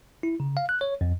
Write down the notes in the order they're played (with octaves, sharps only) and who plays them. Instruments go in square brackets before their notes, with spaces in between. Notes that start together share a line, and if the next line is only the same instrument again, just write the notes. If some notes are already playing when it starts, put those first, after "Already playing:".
[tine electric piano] E4
C#3
F5
F#6
C#5
F2